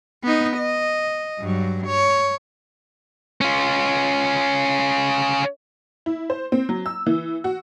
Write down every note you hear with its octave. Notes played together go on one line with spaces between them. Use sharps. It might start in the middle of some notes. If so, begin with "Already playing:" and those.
B3 D#4
D#5
G2 F#3
C#5
C#4 F4
E4
C5
C4
F#3
E6
E3
F#4